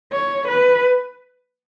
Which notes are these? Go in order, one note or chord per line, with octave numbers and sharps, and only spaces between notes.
C#5
B4